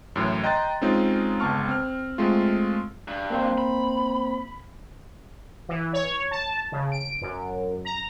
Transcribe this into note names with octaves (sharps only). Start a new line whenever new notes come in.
F#2 A2 E3
D#5 G5 A#5 C6 F#6 A6
G#3 C4 C#4 D#4 F4
G1 C#2 B3 A5 C#6 F6
C4 F6
G#3 A3 C4 F4
G2
A#3 C4 C5
B5
E3
C#5
A5
C#3
D7
F#2
A#5